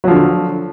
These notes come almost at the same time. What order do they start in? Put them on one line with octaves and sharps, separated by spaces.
F#3 F3 D3